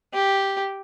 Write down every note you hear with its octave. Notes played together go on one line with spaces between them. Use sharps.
G4